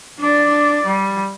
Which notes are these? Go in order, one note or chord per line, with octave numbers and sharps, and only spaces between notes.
D4 D5
G3